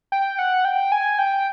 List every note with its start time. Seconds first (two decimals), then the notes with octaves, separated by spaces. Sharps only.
0.12 G5
0.39 F#5
0.65 G5
0.92 G#5
1.19 G5